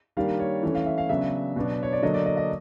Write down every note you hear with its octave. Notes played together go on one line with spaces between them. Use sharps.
D#3 G3 A#3 D4 F5
C#5
E3 A3 C#4 C#5
F5
E5
F5
C#3 F#3 B3 D4 E5
B2 F#3 B3 D4
C#5
D5
D3 F#3 A#3 D4 D#5
D5
D#5
D#5